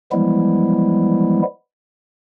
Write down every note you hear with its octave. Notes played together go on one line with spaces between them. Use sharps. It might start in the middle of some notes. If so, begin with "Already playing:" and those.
E3 F3 G3 G#3 B3 E4